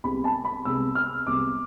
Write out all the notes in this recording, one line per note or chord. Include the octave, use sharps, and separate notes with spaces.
C2 C3 G#3 B3 B5
A5
B5
C2 C3 G#3 B3 E6
F6
C2 C3 G#3 B3 D6